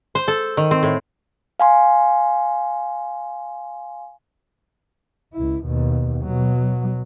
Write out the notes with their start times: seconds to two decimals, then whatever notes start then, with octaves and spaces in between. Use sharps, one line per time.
0.15 C5
0.28 A4
0.57 D#3
0.71 C4
0.83 A2
1.60 F5 G#5 C6
5.33 C#2 E4
5.64 D#2 B2
6.24 B2 F#3